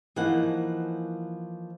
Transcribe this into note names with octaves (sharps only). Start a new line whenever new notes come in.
E3 F3 A#3 D#4 F#5